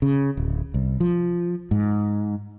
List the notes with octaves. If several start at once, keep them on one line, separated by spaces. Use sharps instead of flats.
C#3
D1
C2
F3
G#2